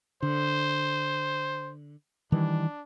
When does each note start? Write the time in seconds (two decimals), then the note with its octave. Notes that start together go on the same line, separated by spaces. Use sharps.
0.22 D3 C5
2.32 D#3 E3 G3 D4